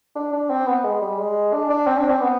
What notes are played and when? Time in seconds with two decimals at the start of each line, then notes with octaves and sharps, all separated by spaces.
0.15 D4
0.33 D4
0.50 C4
0.67 B3
0.84 G#3
1.02 G3
1.19 G#3
1.53 D4
1.69 D4
1.87 C4
1.98 D4
2.10 C4
2.21 B3